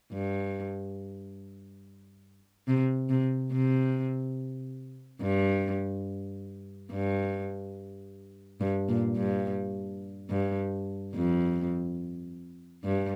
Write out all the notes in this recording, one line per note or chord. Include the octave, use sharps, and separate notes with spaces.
G2
C3
C3
C3
G2
G2
G2
A#2
G2
G2
F2
G2